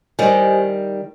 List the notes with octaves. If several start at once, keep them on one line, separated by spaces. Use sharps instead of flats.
D#3 G3 G4 C5 D#5 G#5